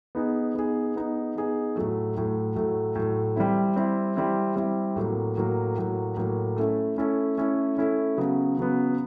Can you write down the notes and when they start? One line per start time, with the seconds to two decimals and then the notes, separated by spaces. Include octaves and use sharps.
0.15 B3 D#4 G#4
0.55 B3 D#4 G#4
0.96 B3 D#4 G#4
1.36 B3 D#4 G#4
1.76 A2 F#3 A3
2.16 A2 F#3 A3
2.55 A2 F#3 A3
2.96 A2 F#3 A3
3.36 G3 C4 E4
3.76 G3 C4 E4
4.16 G3 C4 E4
4.56 G3 C4 E4
4.96 A2 F#3 A#3
5.37 A2 F#3 A#3
5.77 A2 F#3 A#3
6.17 A2 F#3 A#3
6.56 A3 C#4 E4 A4
6.97 A3 C#4 E4 A4
7.38 A3 C#4 E4 A4
7.77 A3 C#4 E4 A4
8.17 C#3 F#3 B3
8.58 C#3 F#3 B3